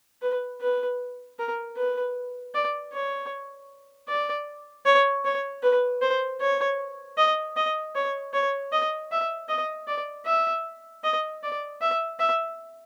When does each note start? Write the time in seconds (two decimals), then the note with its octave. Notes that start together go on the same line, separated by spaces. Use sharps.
0.22 B4
0.61 B4
1.39 A#4
1.77 B4
2.55 D5
2.93 C#5
4.09 D5
4.86 C#5
5.25 C#5
5.63 B4
6.02 C5
6.40 C#5
7.17 D#5
7.57 D#5
7.95 C#5
8.33 C#5
8.73 D#5
9.11 E5
9.49 D#5
9.88 D5
10.26 E5
11.04 D#5
11.43 D5
11.81 E5
12.19 E5